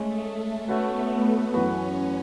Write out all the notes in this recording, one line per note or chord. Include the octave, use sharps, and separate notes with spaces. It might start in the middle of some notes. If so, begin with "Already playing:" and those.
Already playing: G#3 A3 C#4 G#4
A3 B3 C#4 F#4 B4
F#2 E3 B3 C#4 F#4 B4